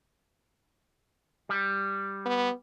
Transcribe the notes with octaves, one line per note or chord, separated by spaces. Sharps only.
G3
B3